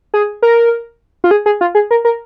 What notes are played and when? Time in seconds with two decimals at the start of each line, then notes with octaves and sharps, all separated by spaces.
0.14 G#4
0.42 A#4
1.24 F4
1.31 G#4
1.46 G#4
1.61 F4
1.75 G#4
1.91 A#4
2.05 A#4